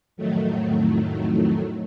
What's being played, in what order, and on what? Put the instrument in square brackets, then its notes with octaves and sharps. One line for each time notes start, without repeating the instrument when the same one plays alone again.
[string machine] F2 A2 D#3 F#3 A3